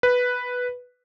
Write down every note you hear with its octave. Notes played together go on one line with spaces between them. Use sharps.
B4